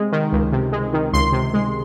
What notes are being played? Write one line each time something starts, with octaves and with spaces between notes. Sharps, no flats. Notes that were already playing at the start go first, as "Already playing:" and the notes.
Already playing: C3 G#3
D#3
C#2
C3
G#3
D#3
C#2 C6
C3
G#3